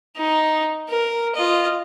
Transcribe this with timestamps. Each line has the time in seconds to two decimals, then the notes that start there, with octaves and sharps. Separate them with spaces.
0.17 D#4
0.89 A#4
1.35 F4 D#5